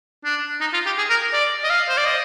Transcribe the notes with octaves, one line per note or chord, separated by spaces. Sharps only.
D4
D#4
F4
G4
G#4
A#4
D5
D#5
F5
C5
D5
D#5